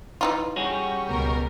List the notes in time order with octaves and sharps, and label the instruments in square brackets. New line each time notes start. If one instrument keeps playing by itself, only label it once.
[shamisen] E3 D#4 F4
[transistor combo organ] G3 C#4 [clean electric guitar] F#4 G#4 C#5
[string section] C#2 B2 A#4